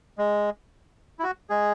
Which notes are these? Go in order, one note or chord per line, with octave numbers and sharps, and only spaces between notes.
G#3
E4
F#4
G#3 G#4